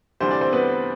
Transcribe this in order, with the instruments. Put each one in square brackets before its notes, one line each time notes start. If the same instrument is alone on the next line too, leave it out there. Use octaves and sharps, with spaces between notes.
[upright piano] D2 C3 E3 G3 D4 C5
D5
C4 C5
B3 B4